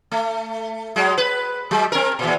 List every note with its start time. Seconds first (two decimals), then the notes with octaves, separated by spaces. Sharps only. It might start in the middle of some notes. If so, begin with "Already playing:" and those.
0.11 A3
0.96 F#3 G#3
1.18 B4
1.71 F#3 G#3
1.92 C4 A#4
2.19 E2 A#2